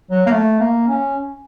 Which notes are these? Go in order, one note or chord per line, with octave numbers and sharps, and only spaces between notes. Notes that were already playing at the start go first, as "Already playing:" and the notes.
F#3
A#3
A3
A#3
C#4